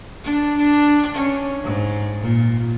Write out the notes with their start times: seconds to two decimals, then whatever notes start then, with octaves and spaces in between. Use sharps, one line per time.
0.24 D4
0.58 D4
1.15 C#4
1.64 G#2
2.21 A#2